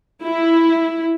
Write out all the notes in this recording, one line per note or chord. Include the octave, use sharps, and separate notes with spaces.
E4